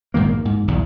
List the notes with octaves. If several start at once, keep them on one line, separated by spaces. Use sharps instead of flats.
A#1 G#2 D#3 A#3
A#3
G#2
B1 E2 G2